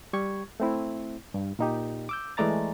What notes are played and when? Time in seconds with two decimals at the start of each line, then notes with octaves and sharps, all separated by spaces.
0.13 G3 G4 C#6 G#6
0.60 A3 C4 E4
1.34 G2
1.59 A#2 D#4 G4
2.09 D6 E6 G6
2.37 E3 G#3 A3 D5 A#5 A6